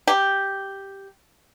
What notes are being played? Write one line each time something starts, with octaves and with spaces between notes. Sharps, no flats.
G4